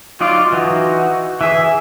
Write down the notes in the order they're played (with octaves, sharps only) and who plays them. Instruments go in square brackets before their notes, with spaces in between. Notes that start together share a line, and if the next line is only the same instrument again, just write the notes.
[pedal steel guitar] F#3 D#4 D5 [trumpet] F4
[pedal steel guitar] E3 D#4 [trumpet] F#4
[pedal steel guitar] E3 G#4 [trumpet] E5